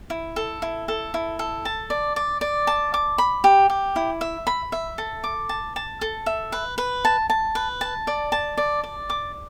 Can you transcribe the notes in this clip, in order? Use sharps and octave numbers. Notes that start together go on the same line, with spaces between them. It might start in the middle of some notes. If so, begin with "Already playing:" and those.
E4
A4
E4
A4
E4
A4
A5
D5
D5
D5
A5
D6
B5
G4
G4
E4
E5
B5
E5
A4
D6
A5
A5
A4
E5
B4
B4
A5
A5
B4
A5
D5
A5
D5
D5
D6